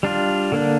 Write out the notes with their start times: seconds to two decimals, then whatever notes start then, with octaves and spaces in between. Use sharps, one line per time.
0.03 G3 D4 F4
0.52 D3 A#3 D4